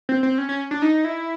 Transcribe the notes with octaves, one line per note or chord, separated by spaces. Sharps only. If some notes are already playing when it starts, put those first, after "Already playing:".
C4
C4
C#4
C#4
D4
D#4
E4